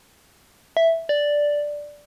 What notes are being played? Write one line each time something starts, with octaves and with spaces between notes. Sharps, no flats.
E5
D5